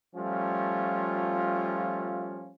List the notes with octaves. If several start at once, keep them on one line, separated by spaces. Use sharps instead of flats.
F3 G3 A3 C#4 F4